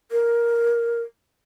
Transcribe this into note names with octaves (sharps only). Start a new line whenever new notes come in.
A#4